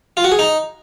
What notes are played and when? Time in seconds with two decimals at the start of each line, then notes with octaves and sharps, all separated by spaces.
0.17 F4
0.24 F#4
0.32 G#4
0.39 D#4